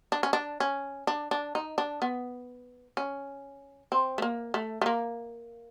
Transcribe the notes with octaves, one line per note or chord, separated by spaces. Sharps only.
D4
C#4
D4
C#4
D4
D4
D#4
D4
B3
C#4
C4
A3
A#3
A3
A3
A#3